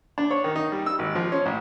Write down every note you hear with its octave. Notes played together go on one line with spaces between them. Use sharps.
D4
C#5
D#3
D#4
G3
E6
G#1
F3
C#4
A1